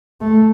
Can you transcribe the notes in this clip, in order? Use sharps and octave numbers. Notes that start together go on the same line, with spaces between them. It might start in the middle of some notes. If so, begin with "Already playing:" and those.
A3